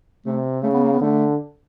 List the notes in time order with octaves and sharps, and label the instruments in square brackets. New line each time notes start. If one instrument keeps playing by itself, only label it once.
[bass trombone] C3 [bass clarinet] A3
[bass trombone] C#3 [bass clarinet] A3
[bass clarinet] B3
A#3
B3
[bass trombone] D3 [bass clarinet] A3